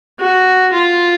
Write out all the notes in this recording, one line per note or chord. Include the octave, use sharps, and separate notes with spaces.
F#4
F4